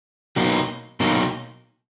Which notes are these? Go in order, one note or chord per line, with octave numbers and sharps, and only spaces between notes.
B2 F#3 A#3 D#4
B2 F#3 A#3 D#4